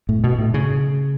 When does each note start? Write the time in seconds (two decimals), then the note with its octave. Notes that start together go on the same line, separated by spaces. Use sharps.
0.09 A2
0.24 B2
0.39 A2
0.54 C#3